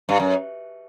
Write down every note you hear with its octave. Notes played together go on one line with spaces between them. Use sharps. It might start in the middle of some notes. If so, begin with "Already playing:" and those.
G2
F#2